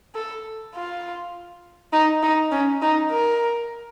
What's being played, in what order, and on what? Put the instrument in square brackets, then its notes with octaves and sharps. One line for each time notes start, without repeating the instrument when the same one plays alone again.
[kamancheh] A4
F4
D#4
D#4
C#4
D#4
A#4